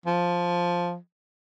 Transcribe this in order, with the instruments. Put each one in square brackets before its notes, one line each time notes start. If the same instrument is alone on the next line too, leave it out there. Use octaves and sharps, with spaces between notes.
[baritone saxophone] F3